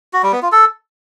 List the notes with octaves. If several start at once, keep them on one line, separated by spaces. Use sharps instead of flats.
F#4
G3
B3
F4
A4